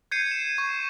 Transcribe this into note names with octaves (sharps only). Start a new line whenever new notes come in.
G6 G#6 C7 C#7 D#7
E7
C#6